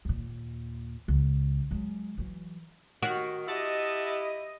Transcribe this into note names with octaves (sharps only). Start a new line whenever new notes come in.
D#2 A#2
C#2
F#3 G#3
E3 F#3
D#3 F#4
E4 G4 D#5 E5 F#5 A5